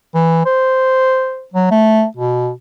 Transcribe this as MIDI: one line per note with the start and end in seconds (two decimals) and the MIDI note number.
0.15 0.43 52
0.46 1.45 72
1.54 1.68 54
1.71 2.04 57
2.17 2.51 47